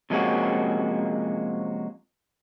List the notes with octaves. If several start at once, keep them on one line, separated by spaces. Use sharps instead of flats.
C3 F3 G#3 A#3 C#4 F#4